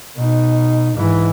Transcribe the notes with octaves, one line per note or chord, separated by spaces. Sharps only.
B2 D#4
G#2 E3